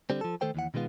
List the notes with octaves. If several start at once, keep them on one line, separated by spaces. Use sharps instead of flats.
D3 G3 C4
F3 A4
D#3 A3 A4 C5 G5
D#2 E3 F#5
B2 D#3 G#3 B3 F4